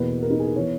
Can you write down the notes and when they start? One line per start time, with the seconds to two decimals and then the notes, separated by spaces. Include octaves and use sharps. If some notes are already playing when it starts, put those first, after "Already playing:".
Already playing: E2 B2 A#3 B4
0.22 A#4
0.30 D#4
0.39 G#4
0.47 A#4
0.56 E3 B3 C#5